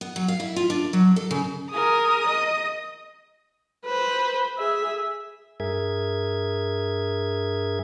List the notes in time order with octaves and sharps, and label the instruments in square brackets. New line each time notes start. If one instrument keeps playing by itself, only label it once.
[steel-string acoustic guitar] B3
F#3
F5
E4
F4
D4
F#3
A4
C#3
[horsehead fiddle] G#4 A#4 [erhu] D#6
[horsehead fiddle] D#5
[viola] B4 C5
G#4 E5
[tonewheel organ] G2 G#4 A#4 E5 G#6